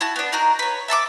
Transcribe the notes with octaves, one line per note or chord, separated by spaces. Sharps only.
E4 F#4 A5
B3 D4
D#4 F#4 A#4
B4 C#5
E5 A5 C#6 D6